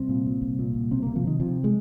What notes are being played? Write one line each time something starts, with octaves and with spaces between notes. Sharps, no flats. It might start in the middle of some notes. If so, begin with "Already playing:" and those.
Already playing: C2 C4
A#2
A#2
C2
A#2
C2
C3 C4
A#3
C3
F3
C3 D#3
C3 F3
G#3